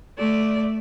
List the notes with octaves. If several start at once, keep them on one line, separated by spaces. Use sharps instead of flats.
A3 D5